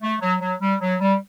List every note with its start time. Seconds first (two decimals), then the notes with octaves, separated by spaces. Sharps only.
0.01 A3
0.21 F#3
0.41 F#3
0.61 G3
0.81 F#3
1.00 G3